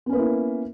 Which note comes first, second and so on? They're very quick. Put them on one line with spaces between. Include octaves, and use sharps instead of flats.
B3 C#4 B4 A#3 E4